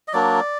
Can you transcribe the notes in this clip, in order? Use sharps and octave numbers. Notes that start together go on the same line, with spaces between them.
D#5
F#3 A#3 D4 D5